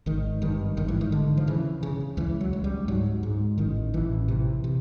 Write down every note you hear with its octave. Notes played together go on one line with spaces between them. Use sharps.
G#1 D#3
G2 D#3
G#1 D#3
E3
D#3
D3
F3
C#3 E3
C#3
C#2 E3
F#3
C#2
G3
G#2 F#3
G#2
A1 D#3
A1 E3
C3 E3
C3